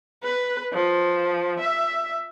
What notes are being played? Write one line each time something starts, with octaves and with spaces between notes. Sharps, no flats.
B4
F3
E5